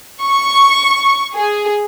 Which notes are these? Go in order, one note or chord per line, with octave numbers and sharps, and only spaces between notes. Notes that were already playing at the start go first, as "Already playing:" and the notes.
C#6
G#4